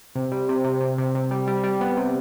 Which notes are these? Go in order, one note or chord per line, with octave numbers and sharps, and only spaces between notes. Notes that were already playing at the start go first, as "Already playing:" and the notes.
C3
G3
C3
C3
C3
C3
C3
G3
G3
G3
B3
C3